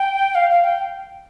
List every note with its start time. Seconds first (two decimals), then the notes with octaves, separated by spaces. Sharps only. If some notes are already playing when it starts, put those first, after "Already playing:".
Already playing: G5
0.35 F5
0.50 F5
0.64 G5